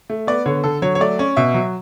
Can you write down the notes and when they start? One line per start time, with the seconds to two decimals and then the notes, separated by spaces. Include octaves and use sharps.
0.10 A3
0.27 B3 D5
0.46 D3 C#5
0.64 D3 A4
0.82 F#3 C#5
0.95 C#5
1.01 A3 D5
1.19 C#4
1.36 B2 E5
1.54 F#3